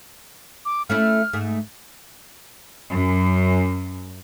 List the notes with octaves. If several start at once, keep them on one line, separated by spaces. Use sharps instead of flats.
D6
A3 C#4 E4 F6
G#2 A3
F#2